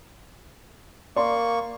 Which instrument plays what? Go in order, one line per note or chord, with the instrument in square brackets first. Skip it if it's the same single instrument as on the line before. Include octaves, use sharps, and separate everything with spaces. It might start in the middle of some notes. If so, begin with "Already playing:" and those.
[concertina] A#3 C#6 [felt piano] D5 C6